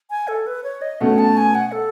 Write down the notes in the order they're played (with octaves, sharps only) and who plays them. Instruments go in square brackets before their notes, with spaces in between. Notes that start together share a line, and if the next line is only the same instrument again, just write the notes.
[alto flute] G#5
A4
B4
C#5
D#5
[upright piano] B2 A3 C#4 [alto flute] F#5
[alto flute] A5
G#5
F#5
A4